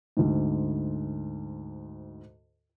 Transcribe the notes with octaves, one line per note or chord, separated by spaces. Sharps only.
D2 G#2